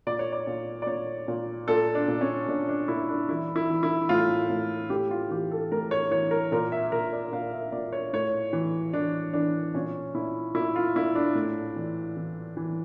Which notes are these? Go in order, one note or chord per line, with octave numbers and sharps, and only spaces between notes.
A#2 D5
C#5
D5
A#2
D5
A#2 C#5
A#2
A#2 A4
D4
A#2
C#4
A#2 D4
D4
A#2 E4
D4
E3 E4
E4
E3
E4
A2 F4
A2
A2 G4
F4
E3 G4
A4
A2 A#4
C#5
E3 C#5
A#4
A#2 A#4
E5
A#2 A#4
D5
A#2 F5
E5
A#2 D5
C#5
A2 C#5
E3
E3 D4
E3 D4
A#2 C#4
A#2 E4
A#2 E4
F4
A#2 E4
D4
A2
E3
E3
E3